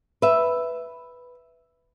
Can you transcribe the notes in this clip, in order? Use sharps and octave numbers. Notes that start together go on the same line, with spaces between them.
B4 E5